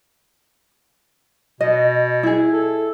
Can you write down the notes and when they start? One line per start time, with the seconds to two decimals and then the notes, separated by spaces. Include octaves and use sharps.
1.61 B2 D#5
2.23 E4 G#4
2.53 A4